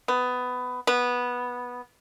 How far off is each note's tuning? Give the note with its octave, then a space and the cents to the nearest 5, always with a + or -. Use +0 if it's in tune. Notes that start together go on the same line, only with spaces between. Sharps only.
B3 +15
B3 -10